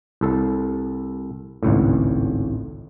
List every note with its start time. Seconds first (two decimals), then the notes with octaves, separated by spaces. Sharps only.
0.21 C2 A4
1.63 G#1 C#2 A2